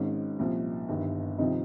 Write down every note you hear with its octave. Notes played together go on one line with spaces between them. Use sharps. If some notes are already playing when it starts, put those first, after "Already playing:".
Already playing: G#1 G#2 D#3 C#4
C2 A#2 F3
G1 G2 D#3
C2 C3 D#3 F3 D#4